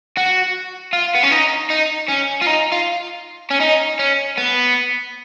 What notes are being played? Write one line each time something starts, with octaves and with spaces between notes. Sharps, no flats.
F#4
F4
B3
C#4
D#4
D#4
C#4
F4
D#4
F4
C#4
D#4
C#4
B3